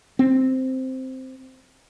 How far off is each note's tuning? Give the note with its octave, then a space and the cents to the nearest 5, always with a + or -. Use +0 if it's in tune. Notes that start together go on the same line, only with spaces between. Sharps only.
C4 -5